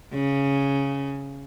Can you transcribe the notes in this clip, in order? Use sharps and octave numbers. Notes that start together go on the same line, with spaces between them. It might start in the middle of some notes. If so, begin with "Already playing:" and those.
C#3